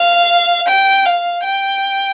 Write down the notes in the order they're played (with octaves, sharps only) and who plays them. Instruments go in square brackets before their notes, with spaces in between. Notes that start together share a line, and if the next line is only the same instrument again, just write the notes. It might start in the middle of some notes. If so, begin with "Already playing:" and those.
Already playing: [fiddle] F5
G5
F5
G5